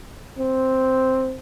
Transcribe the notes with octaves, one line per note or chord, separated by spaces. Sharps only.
C4